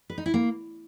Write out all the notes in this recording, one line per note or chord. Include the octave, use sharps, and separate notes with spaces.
B4
D#4
E4
A#3